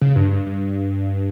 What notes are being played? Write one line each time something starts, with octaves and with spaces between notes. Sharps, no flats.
C#3
G2
G2
G2